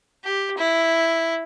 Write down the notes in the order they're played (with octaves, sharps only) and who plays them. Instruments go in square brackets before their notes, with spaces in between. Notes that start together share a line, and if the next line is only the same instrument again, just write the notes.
[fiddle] G4
E4